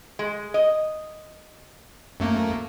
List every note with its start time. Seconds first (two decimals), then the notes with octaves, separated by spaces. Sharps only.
0.19 G#3
0.54 D#5
2.20 F#2 A3 A#3